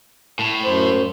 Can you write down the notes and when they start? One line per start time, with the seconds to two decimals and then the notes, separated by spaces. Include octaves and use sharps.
0.39 A2
0.65 F#2 C5